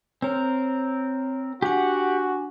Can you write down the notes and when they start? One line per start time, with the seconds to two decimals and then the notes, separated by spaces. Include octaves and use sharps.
0.22 C4 A#4 C#5
1.62 D4 F#4 G4 F#5 G#5